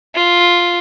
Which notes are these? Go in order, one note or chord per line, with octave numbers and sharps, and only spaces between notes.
F4